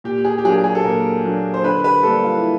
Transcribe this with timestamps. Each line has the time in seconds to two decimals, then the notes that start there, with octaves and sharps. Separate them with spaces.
0.04 A#2 G4
0.25 G#4
0.38 G4
0.44 F#3 A#3 D4 G#4
0.64 G#4
0.75 A4
0.84 A#2 A#4
1.24 F#3 A#3 D4
1.54 C5
1.64 D3 B4
1.84 B4
2.03 G3 A#3 D4 A4
2.24 F4
2.37 E4